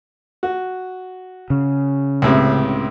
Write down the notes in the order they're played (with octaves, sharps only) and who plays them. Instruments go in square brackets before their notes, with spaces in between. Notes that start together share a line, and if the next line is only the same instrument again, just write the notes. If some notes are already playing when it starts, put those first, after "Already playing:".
[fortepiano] F#4
[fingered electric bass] C#3
[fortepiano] C#2 A2 C3